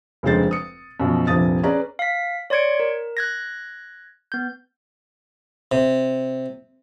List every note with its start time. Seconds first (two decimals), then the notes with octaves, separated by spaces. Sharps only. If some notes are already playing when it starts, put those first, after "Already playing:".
0.23 F1 D2 C#3 G#3 C5 A6
0.51 D#6 C#7
1.00 F#2 B2 F3
1.27 F1 A#1 C3 F3 D#6 A6
1.63 C#4 G#4 B4 D5 A#5
1.99 F5 B6
2.50 C#5 D5 C6 G#6 C#7 D7
2.80 A#4
3.17 F#6 G#6 A#6
4.32 B3 G6
5.72 C3